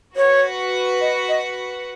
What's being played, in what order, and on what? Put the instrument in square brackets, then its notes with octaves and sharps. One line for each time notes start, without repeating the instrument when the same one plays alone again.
[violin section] F#4 B4 F#5 [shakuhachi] C#5
[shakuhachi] D#5
D#5